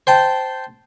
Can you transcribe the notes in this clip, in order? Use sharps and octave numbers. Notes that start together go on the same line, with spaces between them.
C5 G5 A5